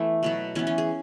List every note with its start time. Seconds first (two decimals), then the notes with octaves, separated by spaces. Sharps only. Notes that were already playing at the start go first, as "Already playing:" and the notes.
Already playing: E3 A3 B3
0.23 B2 F#3 B3
0.55 E3 B3 C#4
0.67 C#4
0.78 G#4